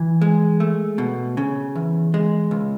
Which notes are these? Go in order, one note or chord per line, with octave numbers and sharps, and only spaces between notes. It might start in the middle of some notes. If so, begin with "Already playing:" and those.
Already playing: E3
G#3
A3
B2
C#3
E2
G#3
C#2